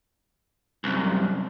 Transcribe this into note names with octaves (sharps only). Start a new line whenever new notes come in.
C2 F#2